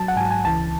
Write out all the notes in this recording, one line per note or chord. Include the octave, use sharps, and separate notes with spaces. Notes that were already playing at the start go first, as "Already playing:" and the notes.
Already playing: F#3 A5
F#5
G#2 F#3 G#5
G#5
C#2 C#3 E3 A5